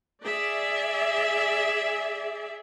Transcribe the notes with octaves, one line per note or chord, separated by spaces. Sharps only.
G#4 D5 E5